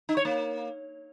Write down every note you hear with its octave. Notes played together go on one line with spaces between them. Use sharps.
D#4
C#5
A#3